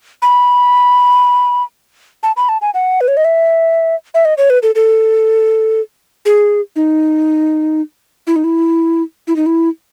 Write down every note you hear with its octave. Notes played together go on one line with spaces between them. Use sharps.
B5
A5
B5
A5
G#5
F#5
B4
C#5
D#5
E5
E5
D#5
C#5
B4
A4
A4
G#4
D#4
E4
D#4
E4
E4
D#4
E4